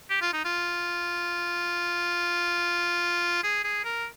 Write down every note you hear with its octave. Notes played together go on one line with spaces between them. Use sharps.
G4
F4
D#4
F4
G#4
G#4
A#4